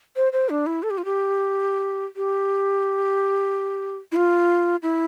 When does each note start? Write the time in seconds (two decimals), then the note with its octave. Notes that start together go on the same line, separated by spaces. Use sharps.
0.16 C5
0.33 C5
0.49 D4
0.66 E4
0.83 A4
0.90 G4
0.98 F4
1.05 G4
2.16 G4
4.12 E4
4.16 F4
4.83 E4